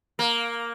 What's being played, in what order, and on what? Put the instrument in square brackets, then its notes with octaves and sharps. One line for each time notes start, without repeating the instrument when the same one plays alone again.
[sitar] A#3